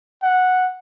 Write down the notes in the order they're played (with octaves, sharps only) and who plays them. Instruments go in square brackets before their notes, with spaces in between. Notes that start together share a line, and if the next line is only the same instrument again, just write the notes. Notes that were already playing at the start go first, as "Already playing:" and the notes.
[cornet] F#5